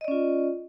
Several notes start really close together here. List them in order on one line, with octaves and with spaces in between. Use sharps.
D#5 D5 C#4 F4